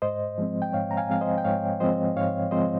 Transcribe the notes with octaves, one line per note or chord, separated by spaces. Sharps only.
G#2 C5 D#5
F3 G#3 C4
G5
G#2 C#5 F5
A#5
F5 G#5
F3 G#3 C4 F5
C5 D#5
G5
G#2 C#5 F5
F3 G#3 C4 C5 D#5
G#2 C#5 F5
F3 G#3 C4 C5 D#5